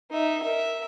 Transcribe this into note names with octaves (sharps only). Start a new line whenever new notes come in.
D#4 E5
A#4 E5